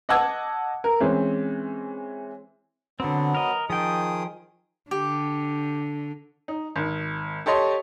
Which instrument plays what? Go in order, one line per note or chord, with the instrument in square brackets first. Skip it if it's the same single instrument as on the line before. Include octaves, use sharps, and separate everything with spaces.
[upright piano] D#5 F#5 A5 D6 E6 G#6
A#4
E3 G#3 C4 C#4
[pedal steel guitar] D3 C4 [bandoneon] F#3 B3
[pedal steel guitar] A#4 D#5
[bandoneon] D#3 G#4 D#6 [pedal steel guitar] F3 G5
[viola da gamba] D3 [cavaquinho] G4
[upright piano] D#4
G#1
G4 A4 C#5 D#5 C6